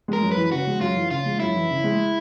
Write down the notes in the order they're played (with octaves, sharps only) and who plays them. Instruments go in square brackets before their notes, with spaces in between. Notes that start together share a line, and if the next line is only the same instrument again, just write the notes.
[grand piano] G#3 [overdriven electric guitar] A#4
[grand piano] F#2
[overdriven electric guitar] B4
[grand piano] E3
[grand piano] C#3 [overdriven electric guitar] F#4
[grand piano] G#3
[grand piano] F#2 [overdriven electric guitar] F4
[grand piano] E3
[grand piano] C#3 [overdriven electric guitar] F4
[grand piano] G#3
[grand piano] F#2 [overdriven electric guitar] E4
[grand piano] E3
C#3
G#3